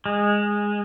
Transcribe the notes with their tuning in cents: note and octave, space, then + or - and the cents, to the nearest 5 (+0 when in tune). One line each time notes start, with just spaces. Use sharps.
G#3 -10